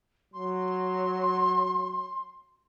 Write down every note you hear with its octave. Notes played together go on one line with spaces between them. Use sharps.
F#3 C6